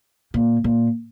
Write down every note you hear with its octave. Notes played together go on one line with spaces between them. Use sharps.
A#2
A#2